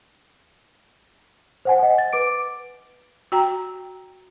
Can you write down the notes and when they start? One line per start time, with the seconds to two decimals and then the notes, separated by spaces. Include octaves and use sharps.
1.65 C5 F#5 G#5
1.79 D#5 F#5
1.98 A6
2.13 B4 D6 D7
3.32 F#4 G5 A#5